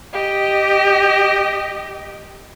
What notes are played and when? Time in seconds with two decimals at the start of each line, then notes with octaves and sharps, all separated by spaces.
0.13 G4 D#5